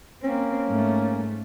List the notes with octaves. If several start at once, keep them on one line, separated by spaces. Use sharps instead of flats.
A#3 C4 C#4
G#2 A3